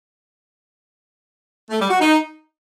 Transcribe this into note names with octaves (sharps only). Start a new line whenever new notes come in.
A3
G3
F#4
D#4